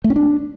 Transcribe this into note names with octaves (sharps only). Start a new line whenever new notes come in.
A3
C#4
D4